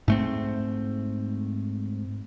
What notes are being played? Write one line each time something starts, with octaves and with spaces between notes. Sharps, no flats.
G#2 A3 C4